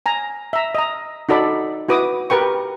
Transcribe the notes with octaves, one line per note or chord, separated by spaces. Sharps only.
G#5 A#5
E5 A#5
D#5 A#5
D#4 F#4 A4 D5 B5
E4 F#4 B4 D6 D#6
G4 A#4 B4 G5 C#6